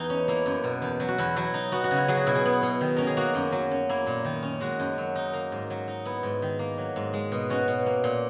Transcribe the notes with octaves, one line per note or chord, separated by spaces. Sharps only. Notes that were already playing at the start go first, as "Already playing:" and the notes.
Already playing: E2 E3 D#4
C#4
A#3 E4
F#2
B2
E2
F#3
F#4
E2 E4
F#3 E4
D#4
B3 F#4
F#4
C#3
E4
F#3 G#4
F#4
B2 E4
G#4
B3
B2
D#3
C#4 A#4
G#4
A#3 F#4
F#2
F#3
C#4
A#3 E4
A#2
D#3
C#4
G#3 F#4
F#2
F#3
D#4
A#3 A#4
G#2
F#3
D#4
B3 E4
G#2
D#3
A#3
F#3
G#2
G#3
B2
C#4 F#4
B2
A#3
A#2